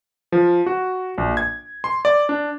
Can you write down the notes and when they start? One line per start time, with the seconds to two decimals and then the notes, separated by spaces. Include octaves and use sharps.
0.32 F3
0.66 F#4
1.18 A#1
1.37 G#6
1.84 C6
2.05 D5
2.29 D4